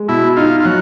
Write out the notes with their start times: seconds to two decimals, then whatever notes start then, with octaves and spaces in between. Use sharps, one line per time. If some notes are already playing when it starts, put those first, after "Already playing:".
Already playing: G#3
0.08 B2 E4
0.37 D#4 F4
0.60 F4
0.65 F#3 F#4